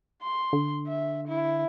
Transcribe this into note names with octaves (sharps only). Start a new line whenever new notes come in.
C6
D3
E5
E4